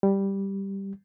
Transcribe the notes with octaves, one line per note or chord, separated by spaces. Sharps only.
G3